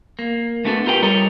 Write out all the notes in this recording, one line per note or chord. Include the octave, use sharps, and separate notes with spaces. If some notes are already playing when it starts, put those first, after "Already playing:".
A#3
A3 B3 D4 F#4 A4
F4 G4 A#4 B4 F#5 G5
G3 A4 A#4 C#5 D#5